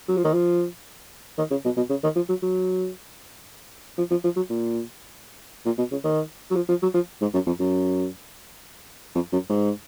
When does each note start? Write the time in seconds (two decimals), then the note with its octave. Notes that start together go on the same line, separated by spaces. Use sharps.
0.08 F#3
0.17 F3
0.24 D#3
0.33 F3
1.38 D#3
1.51 C#3
1.65 B2
1.77 B2
1.89 C#3
2.04 D#3
2.16 F3
2.29 F#3
2.42 F#3
3.98 F3
4.10 F3
4.24 F3
4.36 F#3
4.50 A#2
5.66 A#2
5.78 B2
5.91 C#3
6.04 D#3
6.51 F#3
6.56 F3
6.69 F3
6.82 F#3
6.94 F3
7.21 G#2
7.34 F#2
7.46 F2
7.60 F#2
9.15 F2
9.32 F#2
9.50 G#2